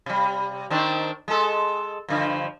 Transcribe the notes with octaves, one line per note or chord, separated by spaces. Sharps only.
C3 G3
D#3 C4 D4
G#3 A4
G2 D3 F3